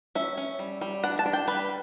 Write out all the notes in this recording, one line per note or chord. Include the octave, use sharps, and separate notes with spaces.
C#4 E5
C#4
G3
G3
D4 F#5
A5
D4
G5
G3 B4